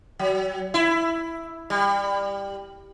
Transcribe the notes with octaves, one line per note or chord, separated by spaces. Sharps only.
F#3
E4
G3